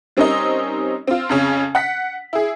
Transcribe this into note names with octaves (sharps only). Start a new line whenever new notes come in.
G3 C4 C#4 D#4 A#4 D#5
C4 F4
F2 C#3 C#4
F#5 B6
E4 G#4